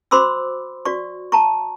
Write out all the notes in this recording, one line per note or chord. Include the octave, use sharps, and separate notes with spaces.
F#4 C5 B5 C6 D6 E6
F#4 D5 C#6
A5 A#5 C#6